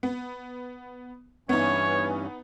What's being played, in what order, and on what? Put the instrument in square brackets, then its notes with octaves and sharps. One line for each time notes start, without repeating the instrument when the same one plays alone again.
[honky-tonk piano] B3
[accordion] G2 E3 C#4 [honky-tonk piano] B3 D#4 [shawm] C#5